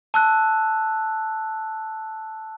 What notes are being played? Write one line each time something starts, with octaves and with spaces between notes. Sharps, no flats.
A5 E6 F#6